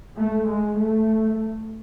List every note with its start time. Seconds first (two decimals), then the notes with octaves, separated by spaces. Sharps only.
0.20 A3
0.49 G#3
0.78 A3